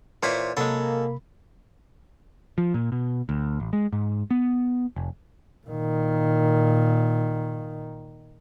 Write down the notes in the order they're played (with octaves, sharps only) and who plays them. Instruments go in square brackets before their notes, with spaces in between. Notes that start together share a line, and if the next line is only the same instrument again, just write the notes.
[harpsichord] A#2 C#5 B5 [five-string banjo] E3 C5
[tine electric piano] C3 B5 [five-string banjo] F#3 G#3 [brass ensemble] A#3 [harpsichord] A4
[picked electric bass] F3
A#2
B2
D2
A1
G#3
G#2
B3
F1
[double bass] A#2 D#3